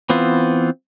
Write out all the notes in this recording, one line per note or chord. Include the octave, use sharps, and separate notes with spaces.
E3 B3 C4 F4